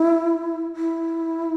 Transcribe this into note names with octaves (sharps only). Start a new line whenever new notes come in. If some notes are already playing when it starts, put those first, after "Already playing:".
Already playing: E4
E4